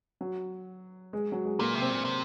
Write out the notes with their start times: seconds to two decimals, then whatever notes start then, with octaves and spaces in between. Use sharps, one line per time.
0.21 F#3
1.13 G#3
1.32 F#3
1.45 G#3
1.59 A#2 A#3
1.74 C3
1.81 C4
1.90 A#2
2.05 C3